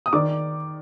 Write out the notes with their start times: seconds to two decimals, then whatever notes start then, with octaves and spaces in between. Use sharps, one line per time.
0.06 D#6
0.13 D#3 D5 D6